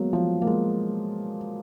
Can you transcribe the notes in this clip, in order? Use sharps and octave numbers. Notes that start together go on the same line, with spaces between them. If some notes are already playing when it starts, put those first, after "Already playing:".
Already playing: F#3 G#3 A#3 B3
F3
A#3
G#3